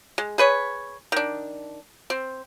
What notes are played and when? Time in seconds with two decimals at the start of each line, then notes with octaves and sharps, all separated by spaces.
0.18 G#3
0.38 G#4 B4 C#5
1.12 D#3 D4
2.10 C4